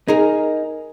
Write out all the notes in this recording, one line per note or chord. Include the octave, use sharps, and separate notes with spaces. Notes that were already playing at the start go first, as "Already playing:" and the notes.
D#4 G#4 A#4